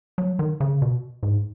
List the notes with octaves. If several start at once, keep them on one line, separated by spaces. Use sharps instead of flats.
F#3
D#3
C#3
B2
G#2